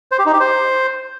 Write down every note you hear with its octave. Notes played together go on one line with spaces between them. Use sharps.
C5
G4
D#4
G4
C5